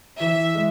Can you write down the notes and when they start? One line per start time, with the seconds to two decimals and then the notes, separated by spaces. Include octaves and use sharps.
0.20 E3 E5
0.55 G#3